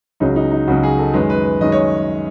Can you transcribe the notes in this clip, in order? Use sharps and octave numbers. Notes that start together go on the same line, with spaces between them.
C#2 C#3 F#3 D#4
D#4
D#4
C#2 C#3 F#3 F#4
G#4
A4
F#2 D#3 G#3 B4
B4
B4
F#2 D#3 G#3 D#5
C#5